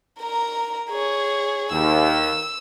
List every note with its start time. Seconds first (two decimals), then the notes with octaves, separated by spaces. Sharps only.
0.21 A#4 A#5
0.90 G#4 C#5
1.72 D#2 E6